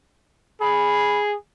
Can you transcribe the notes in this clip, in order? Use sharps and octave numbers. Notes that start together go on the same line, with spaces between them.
G#4 B5